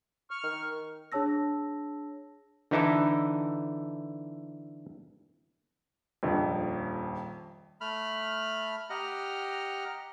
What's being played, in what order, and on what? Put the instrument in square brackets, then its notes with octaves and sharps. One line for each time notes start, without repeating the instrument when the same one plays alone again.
[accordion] C#6 F6
[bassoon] D#3
[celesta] D4 G#4 C#5 A5 E6 A#6
[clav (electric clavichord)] D3 E3 D#4 E4 A4
[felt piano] D#1 A#1 F2
[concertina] A3 B5 F6
G4 D#5 F#5 A#5 F6